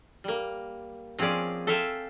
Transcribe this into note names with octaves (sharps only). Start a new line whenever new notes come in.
G3 A#3
F3 C4 C#4 G#4 D5
A4 C5 E5 F5 G5 G#5